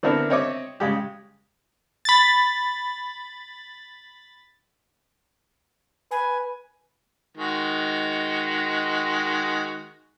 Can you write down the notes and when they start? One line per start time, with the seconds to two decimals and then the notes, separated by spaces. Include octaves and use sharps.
0.03 D3 B3 C4 D4 E4 A#4
0.30 C4 C#5 D#5 E5 D6
0.80 C#3 G#3 G4
2.05 B5 A6
6.11 B4 G#5
7.37 D#3 G#3 F#4